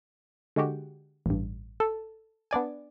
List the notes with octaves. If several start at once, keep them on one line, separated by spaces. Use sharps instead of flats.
D3 G#3 F#4 G4
A1 G2
A4
B3 D4 D5 G#5